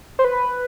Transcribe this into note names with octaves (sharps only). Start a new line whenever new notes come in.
C5
B4